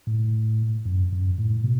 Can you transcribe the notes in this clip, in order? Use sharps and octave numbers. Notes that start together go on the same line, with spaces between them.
A2
F#2
F#2
A2
B2